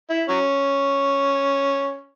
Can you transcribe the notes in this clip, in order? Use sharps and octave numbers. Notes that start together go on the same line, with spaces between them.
E4
F#3 C#4